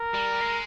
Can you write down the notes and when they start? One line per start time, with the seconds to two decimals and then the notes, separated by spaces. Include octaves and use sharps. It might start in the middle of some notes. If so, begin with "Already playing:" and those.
Already playing: A#4
0.14 G3
0.41 G#3